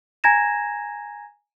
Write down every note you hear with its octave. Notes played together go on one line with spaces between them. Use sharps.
G#5 A#5 G#6 A#6 E7